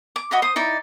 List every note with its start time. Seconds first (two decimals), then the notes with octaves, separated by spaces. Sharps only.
0.16 D6
0.31 F#4 D#5 E5 B5
0.42 C5 D#6
0.56 D#4 E4 D5